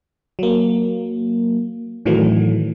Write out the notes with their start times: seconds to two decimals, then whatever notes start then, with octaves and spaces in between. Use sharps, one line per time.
0.39 F#3 A#3
2.06 A2 D#3 E3 F#3 A3